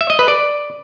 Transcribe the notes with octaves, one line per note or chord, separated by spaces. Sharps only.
E5
D#5
B4
D5